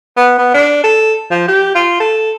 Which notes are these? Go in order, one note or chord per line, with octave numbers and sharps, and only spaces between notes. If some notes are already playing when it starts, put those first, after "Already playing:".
B3
B3
D4
A4
F3
G4
F4
A4